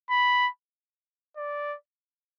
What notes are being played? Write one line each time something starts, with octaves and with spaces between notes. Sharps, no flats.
B5
D5